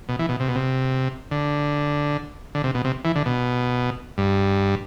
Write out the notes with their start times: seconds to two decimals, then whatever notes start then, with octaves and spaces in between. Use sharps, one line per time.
0.09 B2
0.19 E3
0.29 B2
0.40 C3
0.48 B2
0.55 C3
1.31 D3
2.55 D3
2.64 C3
2.74 B2
2.85 C3
3.05 E3
3.15 D3
3.26 B2
4.18 G2